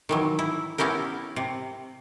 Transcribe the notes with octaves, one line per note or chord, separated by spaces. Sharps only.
D#3 E3 F#3
E4
B3 C#4 E4 G4 A#4
C3